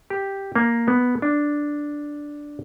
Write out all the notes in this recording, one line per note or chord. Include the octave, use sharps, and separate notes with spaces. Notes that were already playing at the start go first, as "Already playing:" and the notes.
G4
A#3
B3
D4